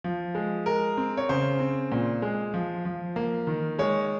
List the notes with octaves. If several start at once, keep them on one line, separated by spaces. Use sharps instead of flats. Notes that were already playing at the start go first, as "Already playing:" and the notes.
F3
G#3
G#3 A#4
C4
C#5
C#3 C5
C4
A#2
G#3
F3
F3
A#3
D#3
G#3 C#5